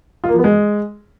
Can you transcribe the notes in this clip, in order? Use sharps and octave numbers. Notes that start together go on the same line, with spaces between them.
F4
A#3
F3
B3
G#3